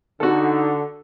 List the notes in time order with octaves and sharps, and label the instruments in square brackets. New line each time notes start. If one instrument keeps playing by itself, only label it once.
[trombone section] D3 [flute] D#4 [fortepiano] F#4 A4